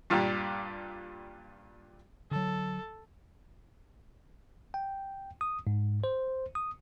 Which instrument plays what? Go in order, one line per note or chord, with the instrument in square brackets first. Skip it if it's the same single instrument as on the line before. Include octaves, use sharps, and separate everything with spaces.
[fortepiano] G2 A#2 G3 D4 G4
[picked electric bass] D3 F#3 [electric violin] A4
[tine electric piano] G5
D#6
G#2
C5
D#6